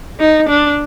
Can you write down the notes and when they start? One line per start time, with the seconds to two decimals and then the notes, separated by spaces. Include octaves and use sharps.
0.20 D#4
0.49 D4